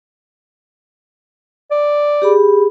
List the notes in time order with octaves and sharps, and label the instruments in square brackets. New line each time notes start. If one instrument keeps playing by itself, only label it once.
[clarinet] D5
[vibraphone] G4 G#4 B5